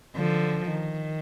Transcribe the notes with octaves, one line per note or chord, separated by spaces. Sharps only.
D3 F3
D#3